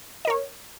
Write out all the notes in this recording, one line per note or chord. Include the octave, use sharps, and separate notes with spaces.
A#4 C#5 D#5